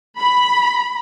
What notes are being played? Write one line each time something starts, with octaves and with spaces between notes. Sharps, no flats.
B5